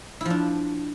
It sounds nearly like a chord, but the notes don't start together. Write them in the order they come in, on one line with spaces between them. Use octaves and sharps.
E4 F3 D4